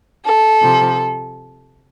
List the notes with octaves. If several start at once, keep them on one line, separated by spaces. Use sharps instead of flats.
A4
C3 F3